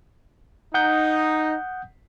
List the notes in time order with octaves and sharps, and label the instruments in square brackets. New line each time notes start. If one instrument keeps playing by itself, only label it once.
[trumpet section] D#4 [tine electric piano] F#5 D#6 G6